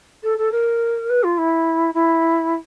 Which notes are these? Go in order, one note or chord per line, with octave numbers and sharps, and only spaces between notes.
A4
A4
A#4
B4
F4
E4
E4